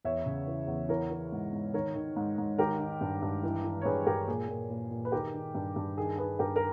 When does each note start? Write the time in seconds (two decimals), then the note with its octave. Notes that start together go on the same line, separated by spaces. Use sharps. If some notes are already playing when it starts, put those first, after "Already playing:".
0.05 E2 C#5 E5
0.26 C#3
0.47 E3
0.68 E2
0.89 E3 A#4 C#5
1.10 E3
1.32 G#2
1.53 G#2
1.74 D#3 A#4 C#5
1.95 D#3
2.16 G#2
2.38 G#2
2.58 D#3 G4 A#4
2.79 D#3
3.01 G2
3.22 G2
3.43 E3
3.64 E3
3.81 C#5
3.85 G2 G#4 B4
4.06 G2 G4 A#4
4.27 A#2 G#4
4.49 A#2
4.70 A#2
4.91 A#2
5.05 B4
5.12 D#3 G4 A#4
5.34 D#3
5.55 G2
5.76 G2
5.97 D#3 G#4
6.18 D#3 G#4 B4
6.39 G2 G4 A#4
6.56 A#4